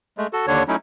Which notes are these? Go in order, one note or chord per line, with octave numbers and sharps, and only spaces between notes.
G#3 A3
F#4 A4
D#2 D3 D4 C#5
F#3 A3 C#4 D#4 E4